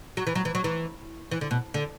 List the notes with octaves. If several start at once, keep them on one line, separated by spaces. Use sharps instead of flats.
F#3
E3
F#3
E3
F#3
E3
E3
D3
B2
D3